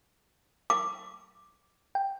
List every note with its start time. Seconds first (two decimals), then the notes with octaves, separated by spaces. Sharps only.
0.70 D6
1.95 G5